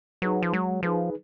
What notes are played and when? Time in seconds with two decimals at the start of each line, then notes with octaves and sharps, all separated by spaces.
0.22 F#3 D#4 G#4 B4
0.42 F3
0.53 F#3 G#3
0.83 F3 D#4 G#4 B4